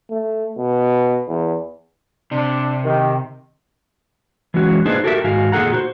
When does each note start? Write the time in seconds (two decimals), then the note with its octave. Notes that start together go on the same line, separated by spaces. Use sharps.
0.10 A3
0.58 B2
1.28 E2
2.32 C3 D4
2.85 D#3 G4
4.54 E3 F#3 G#3 C#4 F#4
4.86 A#3 D4 D#4 G#4 B4 C5
5.04 F#4 G4 A4 A#4 D5 E5
5.24 G#2 D#3 F#4 F5 G#5
5.52 A#2 D#3 G#4 A4 F#5 A#5
5.73 F#4 B4 C5